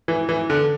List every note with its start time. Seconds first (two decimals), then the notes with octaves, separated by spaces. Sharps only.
0.08 E3
0.29 E3
0.50 D3